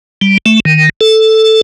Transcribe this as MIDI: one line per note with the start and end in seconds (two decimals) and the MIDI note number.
0.21 0.38 55
0.46 0.60 57
0.65 0.89 51
1.01 1.61 69